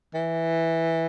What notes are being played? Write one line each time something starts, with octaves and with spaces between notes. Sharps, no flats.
E3